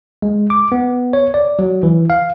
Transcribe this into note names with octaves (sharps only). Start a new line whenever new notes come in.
G#3
D6
B3
C#5
D5
F#3
E3
F5